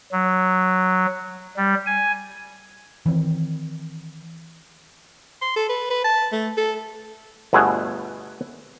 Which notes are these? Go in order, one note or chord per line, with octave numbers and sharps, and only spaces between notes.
F#3
G3
G#5
D#3 E3 C4
C6
A4
B4
B4
A5
A3
A4
G1 B2 A3 G#4 F#5 G#5